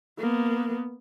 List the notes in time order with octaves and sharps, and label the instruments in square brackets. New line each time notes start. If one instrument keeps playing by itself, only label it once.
[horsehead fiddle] A#3 B3